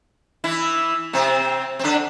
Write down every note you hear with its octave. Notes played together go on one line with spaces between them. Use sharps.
E3 E4
C3 C4
C4
D3 D4